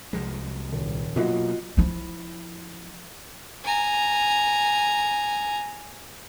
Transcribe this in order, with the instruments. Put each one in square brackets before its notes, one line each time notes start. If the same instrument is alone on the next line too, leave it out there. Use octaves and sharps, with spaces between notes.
[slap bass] C2 F3 G#3
[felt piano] D#1
[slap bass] B2 F#3 A#3 [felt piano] F4 F#4 D#5
[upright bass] F3 E4
[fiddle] G#5 A#5